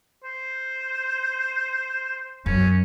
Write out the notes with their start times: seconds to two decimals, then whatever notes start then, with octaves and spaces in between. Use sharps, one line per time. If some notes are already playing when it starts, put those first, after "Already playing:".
0.23 C5
2.46 F#2 C#4